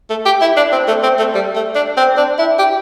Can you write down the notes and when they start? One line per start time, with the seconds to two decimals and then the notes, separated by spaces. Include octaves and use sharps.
0.10 A3
0.26 G4
0.41 E4
0.57 D4
0.72 C4
0.88 A3
1.03 C4
1.19 A3
1.34 G3
1.55 A3
1.75 D4
1.97 C4
2.17 D4
2.38 E4
2.59 G4